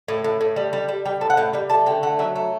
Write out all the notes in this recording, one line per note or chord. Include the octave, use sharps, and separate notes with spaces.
A2
A2
A2
G3
G3
G3
G3 G5
A2 A5
F#5
A2 G5
G3 G5
A3 A5
D3 G5
A3 F#5
F#3 E5
A3